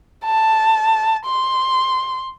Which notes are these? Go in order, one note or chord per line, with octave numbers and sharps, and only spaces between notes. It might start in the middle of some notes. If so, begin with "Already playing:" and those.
A5
C6